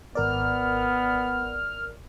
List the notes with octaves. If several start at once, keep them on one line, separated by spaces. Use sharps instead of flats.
G#1 B3 A#4 D5 F6